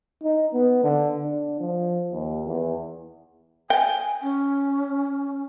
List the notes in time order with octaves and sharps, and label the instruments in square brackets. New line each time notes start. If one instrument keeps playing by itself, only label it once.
[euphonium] D#4
B3
D3
D4
F3
D#2
E2
[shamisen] G5 [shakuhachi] G#5
[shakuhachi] C#4